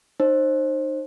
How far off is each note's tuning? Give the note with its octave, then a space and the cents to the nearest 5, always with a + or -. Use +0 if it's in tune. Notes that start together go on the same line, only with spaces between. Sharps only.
D#4 -25 C5 +25